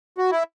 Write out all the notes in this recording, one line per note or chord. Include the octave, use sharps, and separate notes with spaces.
F#4
E4